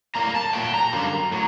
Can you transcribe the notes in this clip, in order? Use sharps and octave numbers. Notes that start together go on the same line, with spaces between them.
A2 G3 A#3 A#5
A5
A#2 F#3 A3 G5
A#5
F#2 D3 G3 A#3
A2 F#3